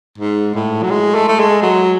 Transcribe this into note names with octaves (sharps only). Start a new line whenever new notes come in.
G#2
A2
F#3
G#3
A3
A3
G#3
F#3